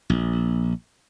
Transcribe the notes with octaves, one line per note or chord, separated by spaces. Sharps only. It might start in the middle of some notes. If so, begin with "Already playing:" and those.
A#1